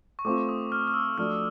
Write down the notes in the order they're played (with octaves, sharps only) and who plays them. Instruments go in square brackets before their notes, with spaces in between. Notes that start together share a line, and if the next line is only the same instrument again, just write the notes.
[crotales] C#6
[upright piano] A3 C4 F4 [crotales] D6
[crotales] D#6
F6
F6
E6
[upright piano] F3 A3 D4 F#4 [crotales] F6